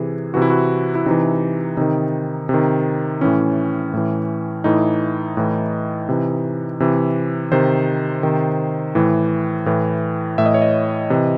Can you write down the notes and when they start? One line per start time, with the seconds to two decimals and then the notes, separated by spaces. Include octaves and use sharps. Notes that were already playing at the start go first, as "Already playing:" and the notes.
Already playing: C3 E3 G#4
0.34 C3 E3 F#4
0.42 E4
0.50 F#4
0.95 E4
1.06 C3 E3 D#4
1.77 C3 D#3 D#4
2.49 C3 D#3
3.21 A2 E3 C#4
3.94 A2 E3
4.64 A2 E3 D#4
5.37 A2 E3
6.09 C3 E3
6.80 C3 E3
7.52 C3 D#3 C5
8.23 C3 D#3
8.95 A2 E3
9.66 A2 E3
10.38 A2 E3 E5
10.46 D#5
10.54 C#5
10.62 D#5
11.10 C3 E3